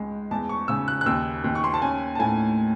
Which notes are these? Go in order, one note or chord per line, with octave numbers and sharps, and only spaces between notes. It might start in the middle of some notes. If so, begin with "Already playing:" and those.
Already playing: C#2 G#3
E2 A5
C#6
C#3 E6
F#6
F#6
D#2 E6
D#2
C#6
C6
A5
C#4 G#5
A5
A2 G#5